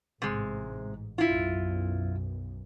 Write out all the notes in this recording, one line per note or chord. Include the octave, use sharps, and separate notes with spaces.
A1 G#2 C3 G#3
B1 F#2 E4 F4